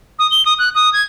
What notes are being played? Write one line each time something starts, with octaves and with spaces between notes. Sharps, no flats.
D#6
G7
D#6
F#6
D#6
G#6